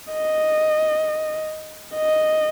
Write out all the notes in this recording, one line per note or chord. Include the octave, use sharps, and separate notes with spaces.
D#5
D#5